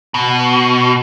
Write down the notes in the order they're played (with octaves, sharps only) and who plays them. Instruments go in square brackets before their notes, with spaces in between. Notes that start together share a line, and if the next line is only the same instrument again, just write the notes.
[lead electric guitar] B2